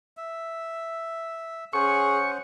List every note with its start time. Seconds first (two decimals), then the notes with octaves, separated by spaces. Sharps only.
0.17 E5
1.73 C#4 G#4 C5 F#5 C#6